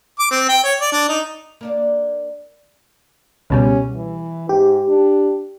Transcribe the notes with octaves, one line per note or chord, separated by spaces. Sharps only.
D6
C4
G5
C#5
D5
D4
D#4
A#3 D4 D5
C#2 B2 G3 C#4
E3
G#2 G4
D4